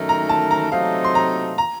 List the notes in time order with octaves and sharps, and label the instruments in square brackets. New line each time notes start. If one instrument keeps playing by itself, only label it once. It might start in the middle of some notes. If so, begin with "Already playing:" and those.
Already playing: [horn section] F#2 D#3 A3 D#4 A#4
[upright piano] A#5
A5
A#5
[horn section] C3 F#3 A3 C4 D#4 [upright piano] F5
[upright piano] C6
A#5
A#5